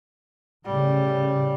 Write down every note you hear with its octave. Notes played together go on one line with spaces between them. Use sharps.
A2 C#3 G3